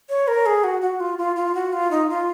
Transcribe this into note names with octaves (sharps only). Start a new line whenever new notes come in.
C#5
A#4
G#4
F#4
F#4
F4
F4
F4
F#4
F4
D#4
F4